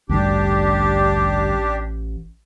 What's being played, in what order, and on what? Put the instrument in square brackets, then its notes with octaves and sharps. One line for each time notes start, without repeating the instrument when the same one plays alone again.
[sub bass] A1 [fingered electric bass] D2 G2 D3 [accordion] D4 G4